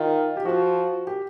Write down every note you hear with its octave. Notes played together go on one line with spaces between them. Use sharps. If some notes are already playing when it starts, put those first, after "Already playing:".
Already playing: D#3 F4
G4
F3 F#4
G4